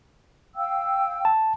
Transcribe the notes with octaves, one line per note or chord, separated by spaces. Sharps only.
F5 G5 E6
A5